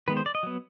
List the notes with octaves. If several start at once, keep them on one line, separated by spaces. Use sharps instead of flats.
D#3 G#3 B3 B4
C5
D5
D#5
F#3 B3